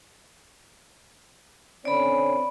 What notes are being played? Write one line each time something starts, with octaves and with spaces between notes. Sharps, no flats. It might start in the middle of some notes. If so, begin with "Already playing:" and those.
D3 C4 C#4 D5 B5